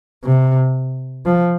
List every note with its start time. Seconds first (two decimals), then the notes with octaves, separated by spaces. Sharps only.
0.24 C3
1.26 F3